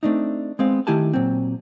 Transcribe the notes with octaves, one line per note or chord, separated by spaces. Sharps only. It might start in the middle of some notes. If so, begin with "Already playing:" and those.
A3 C4 D4 D#4
G#3 B3 C4 F5
D#3 A3 E4 G4 G#5 A5
A#2 F#3 C4